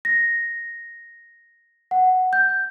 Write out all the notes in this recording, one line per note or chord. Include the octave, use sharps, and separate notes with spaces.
A#6
F#5
G6